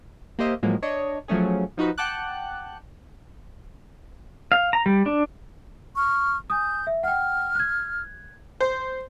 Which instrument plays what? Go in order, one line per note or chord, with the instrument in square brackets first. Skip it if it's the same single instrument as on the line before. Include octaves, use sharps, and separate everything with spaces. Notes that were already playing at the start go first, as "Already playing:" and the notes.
[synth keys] A#3 G4 C5 D#5 E5
A2 F3 F#3 G#3 A#3
D4 C#5 D#5
F3 F#3 A3 C#4 G#4
F3 D#4 F#4 B4
F#5 G5 A5 D6 F#6
[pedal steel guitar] F5
A#5
G3
D4
[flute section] C#6 F6
[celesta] G#5 D#6 [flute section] G6
[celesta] E5
[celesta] F#5 G5 [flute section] F6
[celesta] F#6 G#6
[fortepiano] C5